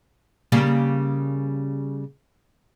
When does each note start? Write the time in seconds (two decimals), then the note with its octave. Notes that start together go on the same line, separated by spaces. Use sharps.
0.52 C#3 G3 A#3